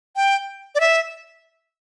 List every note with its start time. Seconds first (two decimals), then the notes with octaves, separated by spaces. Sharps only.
0.16 G5
0.75 D5
0.80 E5